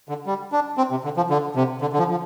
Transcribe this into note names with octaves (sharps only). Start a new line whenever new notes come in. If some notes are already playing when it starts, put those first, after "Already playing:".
D3
G3
D4
C4
C3
D3
F3
D3
C3
D3
D3
F3
F3